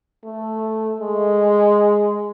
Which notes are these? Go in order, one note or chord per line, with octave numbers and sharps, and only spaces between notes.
A3
G#3